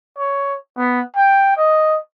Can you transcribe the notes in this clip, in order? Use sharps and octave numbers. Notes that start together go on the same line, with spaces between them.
C#5
B3
G5
D#5